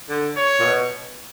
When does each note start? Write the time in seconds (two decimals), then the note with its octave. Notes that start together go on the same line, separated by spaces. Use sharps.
0.09 D3
0.37 C#5
0.60 A#2
0.65 B2